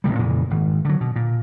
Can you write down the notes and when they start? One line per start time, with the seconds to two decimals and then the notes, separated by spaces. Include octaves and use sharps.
0.04 A1 G#2 C3 G3
0.18 F2 A#2 C#3 E3
0.51 G#1
0.85 D3 F#3
1.01 B2
1.16 A#2